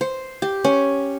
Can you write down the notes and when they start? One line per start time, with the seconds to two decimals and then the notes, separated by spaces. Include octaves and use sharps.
0.01 C5
0.42 G4
0.64 C#4